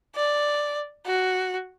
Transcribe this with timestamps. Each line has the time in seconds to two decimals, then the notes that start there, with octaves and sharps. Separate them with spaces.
0.15 D5
1.06 F#4